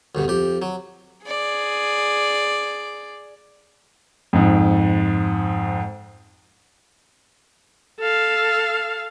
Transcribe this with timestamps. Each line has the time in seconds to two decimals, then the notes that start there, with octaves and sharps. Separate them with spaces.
0.15 D2 G2 B2
0.28 F2 G4
0.62 F#3
1.25 G#4 D5
4.33 F2 G#2
8.00 A4 F5